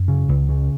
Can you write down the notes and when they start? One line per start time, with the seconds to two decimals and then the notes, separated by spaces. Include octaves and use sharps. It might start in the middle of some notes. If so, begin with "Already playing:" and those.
Already playing: F#2
0.08 C#3
0.29 C#2
0.49 C#3